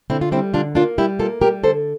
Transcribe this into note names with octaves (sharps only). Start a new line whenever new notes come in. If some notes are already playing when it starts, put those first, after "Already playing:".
D3 C4 E4
F4
G3 C4 E4
D3 D4 F4
A#3 D4 F4
G3 E4 G4
A#3 F4 A4
G3 G4 A#4
D3 A4 C5